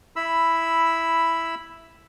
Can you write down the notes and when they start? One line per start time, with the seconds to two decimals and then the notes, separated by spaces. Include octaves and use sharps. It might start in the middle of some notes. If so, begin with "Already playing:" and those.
0.16 E4 B5 E6